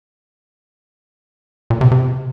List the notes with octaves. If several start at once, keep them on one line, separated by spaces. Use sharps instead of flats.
A#2
C3
C3